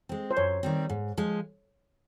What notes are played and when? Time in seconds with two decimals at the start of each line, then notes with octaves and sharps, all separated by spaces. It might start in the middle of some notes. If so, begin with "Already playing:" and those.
0.09 G#3 C4
0.31 C5
0.37 F#2 C#5
0.63 D#3 G3 C4
0.89 G#2
1.17 F3 G#3